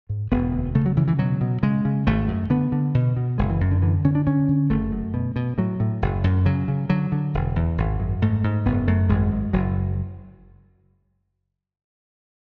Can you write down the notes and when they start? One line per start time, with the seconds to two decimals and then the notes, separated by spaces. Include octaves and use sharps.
0.09 G#2
0.31 E1 B3
0.52 D2
0.75 C#3 A3
0.86 F#3
0.97 C#3 E3
1.08 E3
1.19 B2 F#3
1.41 B2
1.63 C#3 G#3
1.85 C#3
2.07 G#1 A3
2.28 F#2
2.50 D3 B3
2.72 D3
2.94 B2
3.16 B2
3.38 F#1 G#3
3.50 E3
3.61 F#2
3.71 D3
3.82 D3 E3
4.04 D3 C#4
4.15 D4
4.27 D3 C#4
4.48 D3
4.70 F#1 A3
4.92 F#2
5.14 B2
5.36 B2
5.58 A2 F#3
5.80 A2
6.02 F#1
6.24 F#2
6.46 C#3 F#3
6.68 C#3
6.90 D3 F#3
7.12 D3
7.34 E1
7.56 E2
7.78 G#1
8.00 F#2
8.22 G#2 A3
8.44 G#2
8.65 F#1 B3
8.87 F#2 A3
9.09 G#1 G#3
9.31 F#2
9.53 F#1 F#3